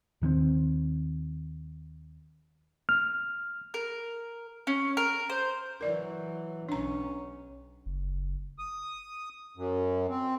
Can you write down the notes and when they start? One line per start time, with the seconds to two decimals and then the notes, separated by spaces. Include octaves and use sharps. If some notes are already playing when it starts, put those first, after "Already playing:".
0.22 D#2 D#3 A#3 C4
2.89 F6
3.74 A#4
4.67 C#4
4.97 A#4
5.30 C5
5.81 E3 F#3 A#4 D5
6.69 B1 C#4 D4 A#5
7.86 F#1
8.59 D#6
9.57 F#2
10.09 C4